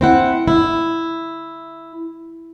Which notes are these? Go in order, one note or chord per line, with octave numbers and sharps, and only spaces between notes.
C4 E4 F#5
E4